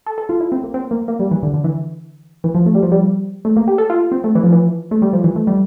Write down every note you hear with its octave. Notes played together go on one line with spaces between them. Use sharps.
A4
A4
F4
E4
C4
A#3
C4
A#3
A#3
G3
E3
D3
D3
E3
E3
F3
A3
G3
F3
G3
A3
A#3
G4
A4
F4
C4
A3
E3
F3
E3
A3
G3
F3
E3
A3
G3